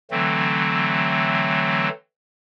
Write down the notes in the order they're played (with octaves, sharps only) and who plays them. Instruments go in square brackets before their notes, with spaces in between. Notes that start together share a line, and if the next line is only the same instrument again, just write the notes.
[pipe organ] D3 E3 F#3 A3 C4